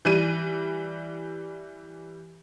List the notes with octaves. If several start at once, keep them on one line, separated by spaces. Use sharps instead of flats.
E3 G3 D#7